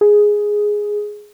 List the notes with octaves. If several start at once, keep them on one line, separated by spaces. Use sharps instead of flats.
G#4